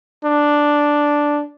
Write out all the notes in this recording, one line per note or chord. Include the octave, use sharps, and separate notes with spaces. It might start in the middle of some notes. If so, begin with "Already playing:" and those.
D4